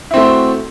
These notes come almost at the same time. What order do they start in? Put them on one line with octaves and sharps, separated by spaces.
E4 C4 A3 C5 F#4